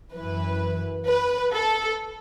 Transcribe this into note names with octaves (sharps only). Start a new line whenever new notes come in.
F#2 E3 B4
B4
A4